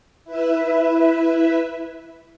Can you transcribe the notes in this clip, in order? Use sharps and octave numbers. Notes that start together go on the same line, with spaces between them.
E4 B4 E5